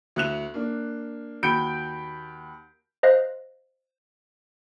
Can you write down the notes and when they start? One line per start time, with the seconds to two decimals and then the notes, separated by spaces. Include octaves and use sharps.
0.16 D2 F#6 F7
0.54 A#3 D4
1.43 D#2 F#4 B5 G6 D7
3.03 C5 D#5 F5 F#6 A#6